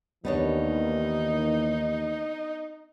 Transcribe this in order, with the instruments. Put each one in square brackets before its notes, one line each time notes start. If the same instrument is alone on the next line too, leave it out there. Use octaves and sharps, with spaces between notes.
[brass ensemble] D#2 E3 [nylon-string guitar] B3 D4 C#5 [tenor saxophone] D#4